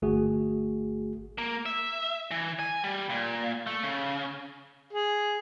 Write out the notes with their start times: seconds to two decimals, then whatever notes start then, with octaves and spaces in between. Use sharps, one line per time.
0.02 G1 A3 F#4 G#4
1.38 A#3
1.66 E5
2.31 E3
2.59 G#5
2.84 G3
3.10 A#2
3.67 A3
3.83 C#3
4.93 G#4